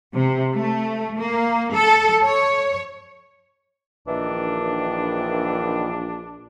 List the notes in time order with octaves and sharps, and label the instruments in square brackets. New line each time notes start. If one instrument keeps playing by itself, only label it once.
[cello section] C3
A3
A#3
A4
C#5
[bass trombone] A#1 [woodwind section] D#3 E3 [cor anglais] D4